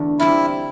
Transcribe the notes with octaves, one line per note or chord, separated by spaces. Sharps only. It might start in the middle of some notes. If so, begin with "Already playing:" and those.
Already playing: E2 D3 A3
G3 C4 E4 F4